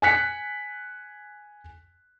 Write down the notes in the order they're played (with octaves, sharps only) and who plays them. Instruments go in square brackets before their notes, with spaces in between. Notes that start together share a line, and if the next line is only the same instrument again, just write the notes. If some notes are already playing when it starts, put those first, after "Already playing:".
[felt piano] G#5 F#6 B6 C#7